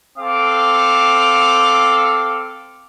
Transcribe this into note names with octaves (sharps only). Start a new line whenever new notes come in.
C4 A4 F5 D6